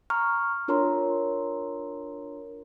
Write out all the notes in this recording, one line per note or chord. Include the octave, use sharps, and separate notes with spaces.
A#5 C#6 F6
D4 F4 A#4 C#5 A#5 C6